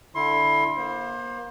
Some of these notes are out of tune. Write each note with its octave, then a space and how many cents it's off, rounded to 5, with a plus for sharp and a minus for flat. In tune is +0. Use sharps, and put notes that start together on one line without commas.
D3 +0 E4 +0 C6 +25
A#3 +35 C5 +25